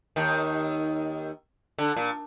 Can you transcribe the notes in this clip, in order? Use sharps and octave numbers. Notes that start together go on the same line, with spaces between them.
D#2 D#3
D3
A#2